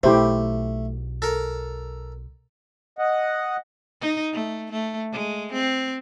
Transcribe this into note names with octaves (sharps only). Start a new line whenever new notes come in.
B1 A3 E4 G4 C5
A4 A#4
D#5 F#5
D#4
A3
A3
G#3
C4